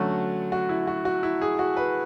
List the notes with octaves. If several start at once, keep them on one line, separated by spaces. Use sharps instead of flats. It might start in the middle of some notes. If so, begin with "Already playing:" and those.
Already playing: D3 F#3 A3 C#4 F#4
F#4
E4
F#4
F#4
E4
G#4
F#4
B4